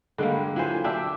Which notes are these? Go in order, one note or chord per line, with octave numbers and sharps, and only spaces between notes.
G2 D3 G3 G#3 A#3
F#3 E4 F4 C5 G#5
D4 G4 E5 G5 E6